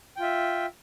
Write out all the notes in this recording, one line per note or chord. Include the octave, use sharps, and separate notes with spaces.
F4 E5 G5